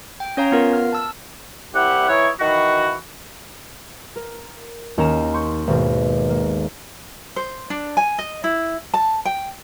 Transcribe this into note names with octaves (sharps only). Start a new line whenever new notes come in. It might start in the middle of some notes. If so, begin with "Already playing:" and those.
G5
C#4 C#5 F5 A#5
B3 F4 A#4 F5
F6
A5 E6
C2 E4 G4 F#5
E3 D#4 E4 C#5
D#3 E3 F#4
A#4
D#2 C#4 A#4 A#5 E7
C6 C#6 G6
G#1 B2
A#3
C5
D4
G#5
D#5
E4
A5
G5